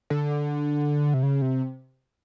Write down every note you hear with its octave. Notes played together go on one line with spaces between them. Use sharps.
D3
C3
C#3
C3